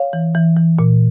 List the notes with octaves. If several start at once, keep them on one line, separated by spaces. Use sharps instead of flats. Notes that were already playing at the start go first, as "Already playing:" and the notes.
Already playing: C#5 F5
E3
E3
E3
A#2